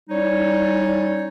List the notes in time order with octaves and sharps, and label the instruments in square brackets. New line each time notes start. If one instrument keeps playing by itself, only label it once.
[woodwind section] G3 C#4 D#4 E4 C#5 D5